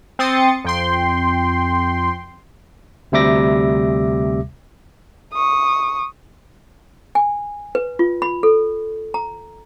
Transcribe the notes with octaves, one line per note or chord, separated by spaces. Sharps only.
C4 C6 D#6 A6 C#7
F2 G5 C6
D2 C3 G3 E5 D6 A#6
C#6 D#6
G#5
B4
F4
B5
A4
A#5